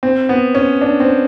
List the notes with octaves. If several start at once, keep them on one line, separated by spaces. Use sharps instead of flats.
C4
B3
C#4
D4
C4